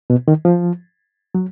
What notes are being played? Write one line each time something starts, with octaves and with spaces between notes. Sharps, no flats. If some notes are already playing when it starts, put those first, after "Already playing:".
B2
D#3
F3
F#3